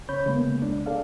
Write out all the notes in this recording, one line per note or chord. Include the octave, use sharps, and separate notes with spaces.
C#3 C#4 C#5 B5 G6
C#3 G#3 A#3 B3
C2 D4
D4 G#4 A4 D5 F5